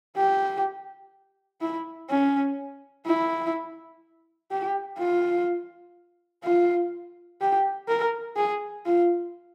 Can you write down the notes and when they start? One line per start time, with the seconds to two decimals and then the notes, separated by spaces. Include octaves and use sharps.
0.16 G4
1.61 E4
2.10 C#4
3.06 E4
4.51 G4
4.99 F4
6.44 F4
7.41 G4
7.88 A#4
8.37 G#4
8.86 F4